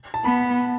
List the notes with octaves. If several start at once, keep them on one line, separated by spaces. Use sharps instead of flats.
A5
B3 B5